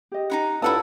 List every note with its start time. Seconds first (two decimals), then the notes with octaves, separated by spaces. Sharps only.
0.12 G4 D#5
0.30 D#4 E4 F#5
0.62 G2 E4 F4 A4 C#5 F#5 A5 D#6